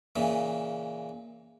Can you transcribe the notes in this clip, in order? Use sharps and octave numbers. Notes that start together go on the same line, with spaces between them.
A#2 C#3 E3